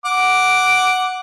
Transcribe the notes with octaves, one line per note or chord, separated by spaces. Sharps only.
F#5 D6